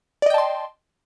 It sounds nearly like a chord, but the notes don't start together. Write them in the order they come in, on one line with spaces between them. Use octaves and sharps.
D5 D#5 G5 A5 C6